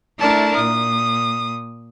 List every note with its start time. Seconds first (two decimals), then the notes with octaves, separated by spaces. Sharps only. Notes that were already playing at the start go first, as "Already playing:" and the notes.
0.19 A3 D4 E4 A#4 D5 A5
0.56 A#2 D#6